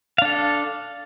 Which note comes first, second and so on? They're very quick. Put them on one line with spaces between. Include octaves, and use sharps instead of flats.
F5 D4 A4